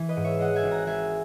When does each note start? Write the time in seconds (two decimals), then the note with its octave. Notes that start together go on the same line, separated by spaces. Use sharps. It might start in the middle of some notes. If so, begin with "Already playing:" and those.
Already playing: E3
0.09 B4 D#5
0.17 G#2
0.24 C#5 E5
0.38 G#3 D#5 F#5
0.55 E5 G#5
0.63 G#1
0.71 F#5 A#5
0.86 G#3 E5 G#5